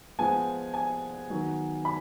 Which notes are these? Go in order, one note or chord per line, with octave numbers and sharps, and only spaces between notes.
F3 G#3 B3 G#5
G#5
D#3 F#3 B3
B5